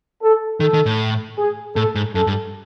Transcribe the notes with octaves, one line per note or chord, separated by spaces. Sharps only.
A4
D#3 A4
D#3
A2
G#4
A2 A4
G#2
F#2 A4
G2